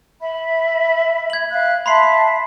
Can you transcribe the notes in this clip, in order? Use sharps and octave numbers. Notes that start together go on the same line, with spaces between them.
E5 B5
G#6 F#7
E5 F5 F#6
E5 A5 B5 C6 C7